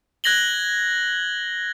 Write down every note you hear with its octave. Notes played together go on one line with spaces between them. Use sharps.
F#6 G#6 A#6 F#7 G7